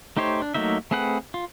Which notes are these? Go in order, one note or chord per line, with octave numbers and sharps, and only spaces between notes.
A3 D#4 G4 C5 C#5
D4
F#3 A3 A#3 D#4 E5
A3 C4 G#4 B4 F#5
F4